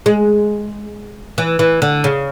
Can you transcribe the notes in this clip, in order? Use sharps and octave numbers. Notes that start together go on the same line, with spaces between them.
G#3
E3
E3
D3
C#3